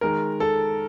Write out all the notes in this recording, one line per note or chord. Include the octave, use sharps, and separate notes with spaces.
D#3 G#3 A#4
A4